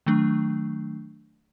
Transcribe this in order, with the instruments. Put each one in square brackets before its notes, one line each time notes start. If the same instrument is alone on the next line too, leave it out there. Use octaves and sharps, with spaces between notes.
[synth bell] D#3 F#3 A3 D4